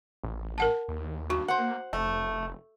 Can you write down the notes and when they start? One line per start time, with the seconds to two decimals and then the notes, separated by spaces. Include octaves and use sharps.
0.24 A1
0.58 A#4 F#5 A5
0.88 D#2
1.30 G2 F#4
1.48 A#3 C5 F#5
1.93 F1 A3